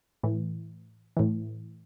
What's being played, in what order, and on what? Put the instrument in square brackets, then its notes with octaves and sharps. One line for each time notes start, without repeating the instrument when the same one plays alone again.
[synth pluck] A2 E3
A2 E3